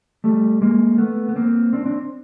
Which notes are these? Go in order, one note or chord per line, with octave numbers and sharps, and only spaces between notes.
G3 A3
G#3 A#3
A3 B3
B3
A#3 C4
C4 D4
C4 D4